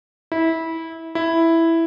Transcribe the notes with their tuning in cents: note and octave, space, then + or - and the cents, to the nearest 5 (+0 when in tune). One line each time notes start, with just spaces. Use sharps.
E4 -20
E4 +0